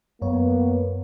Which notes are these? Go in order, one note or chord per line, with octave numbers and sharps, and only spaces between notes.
F#2 A#3 B3 C#5